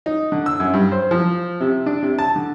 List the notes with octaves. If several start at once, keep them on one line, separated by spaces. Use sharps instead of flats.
D#4
D3
E6
F#2
G2
C5
F3
C3
D4
C3
A5
D3